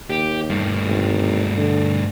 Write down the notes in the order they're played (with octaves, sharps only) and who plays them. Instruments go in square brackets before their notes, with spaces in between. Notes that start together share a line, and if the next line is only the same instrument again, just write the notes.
[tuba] D#2 [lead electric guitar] G4
[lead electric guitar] G2 A3
[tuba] G#1
D3